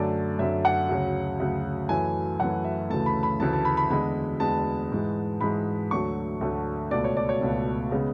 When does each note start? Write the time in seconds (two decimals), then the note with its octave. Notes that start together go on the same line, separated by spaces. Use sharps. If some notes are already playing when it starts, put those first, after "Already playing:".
Already playing: F#2 D3 A3 D5
0.39 F#2 D3 A3 E5
0.65 F#5
0.89 D2 C#3 F#3
1.40 D2 C#3 F#3
1.89 F#2 E3 A3 G#5
2.40 F#2 E3 A3 F#5
2.65 E5
2.90 D2 C#3 E3 A3 A5
3.06 B5
3.23 B5
3.40 D2 C#3 E3 A3 A5
3.53 A5
3.65 B5
3.77 B5
3.90 E2 D3 G#3 B5
4.40 E2 D3 G#3 A5
4.91 G#2 E3 G#3
5.41 G#2 E3 G#3 B5
5.91 D2 D3 F#3 A3 C#6
6.41 D2 D3 F#3 A3
6.91 C#2 B2 A3 D5
7.04 C#5
7.17 D5
7.29 C#5
7.41 C#2 B2 A3
7.91 C#3 G#3 B3